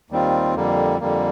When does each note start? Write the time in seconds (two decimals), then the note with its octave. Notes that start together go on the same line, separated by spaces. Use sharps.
0.10 D#2 D#3 G3 C4 F4
0.55 F2 D3 G3 A#3
1.00 F2 D3 G3 A#3